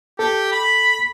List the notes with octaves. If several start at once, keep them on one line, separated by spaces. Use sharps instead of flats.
G4 A4
B5